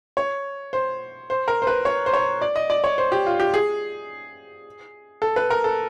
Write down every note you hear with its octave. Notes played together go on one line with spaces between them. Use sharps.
C#5
C5
C5
A#4
C5
B4
C#5
C5
C#5
D5
D#5
D5
C#5
C5
G4
F4
G4
G#4
A4
B4
A#4
A4